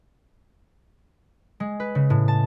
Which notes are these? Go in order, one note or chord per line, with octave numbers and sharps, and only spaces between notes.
G#3
B4
C#3
A2
A5